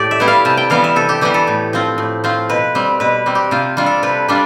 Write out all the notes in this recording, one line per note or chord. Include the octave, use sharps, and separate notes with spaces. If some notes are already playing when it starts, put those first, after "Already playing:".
Already playing: A2 G4 A4 D5
E5
G3 B3 E4
F5
C3 A5
G5
E3 G3 B3 F5
E5
C3 A4
G4
E3 G3 B3 G4
A4
A2
F3 C4 F4
A2
F3 C4 F4
B2 B4
G3 C4
B2 B4
G3 C4
G4
C3 F4
G3 D4 F4
A4
C3 B4
G3 D4 F4